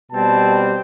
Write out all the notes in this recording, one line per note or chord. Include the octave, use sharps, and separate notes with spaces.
B2 G3 C4 A5